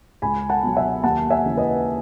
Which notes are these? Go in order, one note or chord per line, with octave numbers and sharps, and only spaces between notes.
C#2 G#5 B5
F#5 A5
B2 F#3
E5 G#5
D#2 F#5 A5
E5 G#5
C#3 E3
B4 D#5